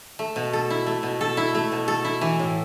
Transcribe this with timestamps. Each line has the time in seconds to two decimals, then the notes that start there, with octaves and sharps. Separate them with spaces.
0.19 A3
0.36 B2
0.53 A4
0.70 E4
0.86 A3
1.03 B2
1.21 A4
1.37 E4
1.55 A3
1.72 B2
1.88 A4
2.04 E4
2.21 E3
2.39 A2